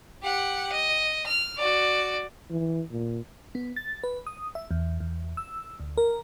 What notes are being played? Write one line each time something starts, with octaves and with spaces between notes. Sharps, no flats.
G4 F#5
D#5
F6
F#4 D5
E3
A#2
B3
A6
B4
D#6
E5
E2
E2
E6
D2
A#4